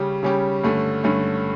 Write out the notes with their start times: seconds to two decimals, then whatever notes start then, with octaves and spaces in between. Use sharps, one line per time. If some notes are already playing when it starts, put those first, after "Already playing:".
Already playing: C#3 G3 C#4 G4
0.23 C#3 G3 C#4 G4
0.64 G2 D3 A3 C#4
1.04 G2 D3 A3 C#4